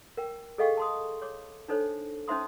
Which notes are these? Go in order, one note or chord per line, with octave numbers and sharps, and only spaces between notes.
A#4 G5
G#4 A4 D#5 F5 G5 C#6
A5 C6 D#6
C#5 D6
D4 D#4 A4 C5 C#5
C#4 D#4 C5 E5 C6 D#6